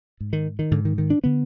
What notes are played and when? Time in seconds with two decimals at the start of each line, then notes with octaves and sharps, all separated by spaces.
0.20 G#2
0.33 D#3
0.59 D#3
0.71 G#2 D3
0.85 D#3
0.98 D#3
1.10 D4
1.24 D3 B3